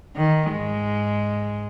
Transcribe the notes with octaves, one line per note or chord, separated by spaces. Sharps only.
D#3
G#2 G#3